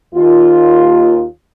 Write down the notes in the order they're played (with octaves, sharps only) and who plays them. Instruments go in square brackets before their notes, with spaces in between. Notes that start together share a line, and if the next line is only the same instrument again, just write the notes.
[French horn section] D#2 F4